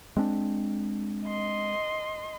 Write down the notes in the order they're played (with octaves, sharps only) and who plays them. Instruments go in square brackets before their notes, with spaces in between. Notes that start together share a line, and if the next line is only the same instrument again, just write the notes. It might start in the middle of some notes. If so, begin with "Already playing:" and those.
[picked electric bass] G#3 C4 D4
[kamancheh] D#5 C6